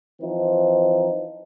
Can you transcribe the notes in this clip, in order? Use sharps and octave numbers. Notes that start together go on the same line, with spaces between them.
E3 F3 C4 D#4